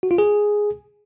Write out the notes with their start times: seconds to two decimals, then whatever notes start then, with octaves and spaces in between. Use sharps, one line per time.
0.03 F#4
0.11 F4
0.18 G#4